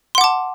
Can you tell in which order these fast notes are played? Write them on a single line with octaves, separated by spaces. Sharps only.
C6 F#5 D6 A5